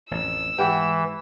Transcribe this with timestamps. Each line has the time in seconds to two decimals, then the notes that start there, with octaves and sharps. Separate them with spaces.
0.11 A1 F2 E6
0.58 G#2 E3 G4 F#5